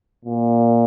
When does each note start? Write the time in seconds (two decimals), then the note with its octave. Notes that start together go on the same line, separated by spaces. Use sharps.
0.25 A#2